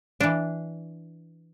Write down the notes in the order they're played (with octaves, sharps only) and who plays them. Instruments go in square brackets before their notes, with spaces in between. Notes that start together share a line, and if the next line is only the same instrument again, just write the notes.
[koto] E3 D4